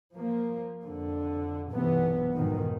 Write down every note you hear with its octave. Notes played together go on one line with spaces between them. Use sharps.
F3 A#3
F2 D3
B1 G2 C3 E3 B3
F2 G#2 B2 D#3